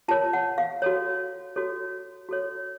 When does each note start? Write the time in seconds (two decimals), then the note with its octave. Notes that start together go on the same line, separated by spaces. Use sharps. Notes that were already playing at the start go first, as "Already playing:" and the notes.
0.08 F4 A#4 C#5 A5
0.33 F#5
0.58 F5
0.82 F#4 A4 C#5
1.56 F#4 A4 C#5
2.29 F#4 A4 C#5